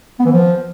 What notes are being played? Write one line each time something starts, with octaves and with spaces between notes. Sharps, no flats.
B3
E3
F3